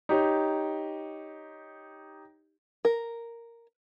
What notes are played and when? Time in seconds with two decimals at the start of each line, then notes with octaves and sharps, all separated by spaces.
0.09 D#4 G4 C#5
2.85 A#4